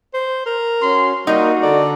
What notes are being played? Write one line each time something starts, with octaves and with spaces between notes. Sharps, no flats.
C5
A#4
C#4 F#4 C6
G3 A#3 D#4 F#4 A#4 D#5
D3 A4 D5 A#5